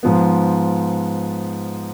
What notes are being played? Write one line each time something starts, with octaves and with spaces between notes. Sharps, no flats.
G#2 F3 B3